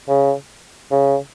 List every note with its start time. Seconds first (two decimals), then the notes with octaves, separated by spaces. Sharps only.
0.08 C#3
0.91 C#3